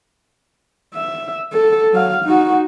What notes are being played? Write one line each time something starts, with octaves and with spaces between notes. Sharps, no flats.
E5
A4
F#3 F5
D#4 F#4